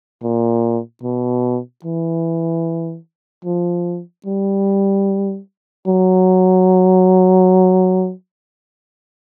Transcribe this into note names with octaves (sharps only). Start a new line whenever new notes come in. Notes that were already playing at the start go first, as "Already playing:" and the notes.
A#2
B2
E3
F3
G3
F#3